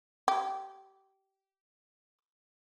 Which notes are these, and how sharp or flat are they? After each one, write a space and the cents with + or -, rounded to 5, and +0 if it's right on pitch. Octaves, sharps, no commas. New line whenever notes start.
G4 -20